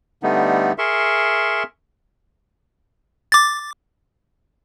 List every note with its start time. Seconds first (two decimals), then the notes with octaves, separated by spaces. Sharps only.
0.23 D3 G3 A3 B3 D#4
0.78 G#4 A#4 E5 C6 C#6
3.32 D6 A6